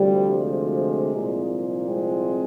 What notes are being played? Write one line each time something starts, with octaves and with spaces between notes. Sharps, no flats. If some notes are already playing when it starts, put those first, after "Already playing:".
Already playing: D2 C3 F3 G3
G#3
C2 A#2 F3
G#3 C4